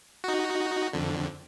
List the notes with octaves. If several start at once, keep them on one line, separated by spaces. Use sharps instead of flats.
D#4 F#4
F2 D3